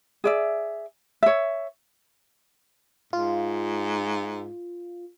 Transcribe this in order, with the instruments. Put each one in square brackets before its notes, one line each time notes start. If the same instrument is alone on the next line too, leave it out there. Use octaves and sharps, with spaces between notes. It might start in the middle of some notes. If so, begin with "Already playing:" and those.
[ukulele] G#4 D5 E5
C#5 E5
[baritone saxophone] G#2 [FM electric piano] F4